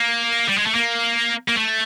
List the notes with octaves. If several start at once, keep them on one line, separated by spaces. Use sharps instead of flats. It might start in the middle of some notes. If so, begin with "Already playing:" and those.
Already playing: A#3
G3
G#3
A3
A#3
A#3
A3